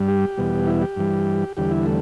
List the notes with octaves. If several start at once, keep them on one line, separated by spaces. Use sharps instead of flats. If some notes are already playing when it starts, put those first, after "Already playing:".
Already playing: G2 G3
G4
E2 B2 G3
E4
G4
G2 E3 G3
E2 D3 G3 G4
E4
A3